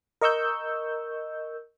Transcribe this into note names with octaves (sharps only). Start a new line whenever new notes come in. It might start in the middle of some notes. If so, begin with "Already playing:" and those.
A#4 D#5 C#6 E6 G6